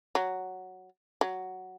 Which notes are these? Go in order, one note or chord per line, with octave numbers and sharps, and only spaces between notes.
F#3
F#3